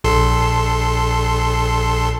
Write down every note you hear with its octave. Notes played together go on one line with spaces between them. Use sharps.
A#1 A4 C6